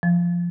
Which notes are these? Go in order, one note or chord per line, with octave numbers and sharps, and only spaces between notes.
F3